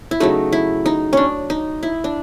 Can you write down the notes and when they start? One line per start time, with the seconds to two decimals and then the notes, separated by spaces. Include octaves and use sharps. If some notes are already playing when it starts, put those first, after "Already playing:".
0.11 E4
0.20 C#3 F#3 A3 D#4
0.53 E4
0.86 D#4
1.13 C#4 D4
1.50 D#4
1.83 E4
2.04 D4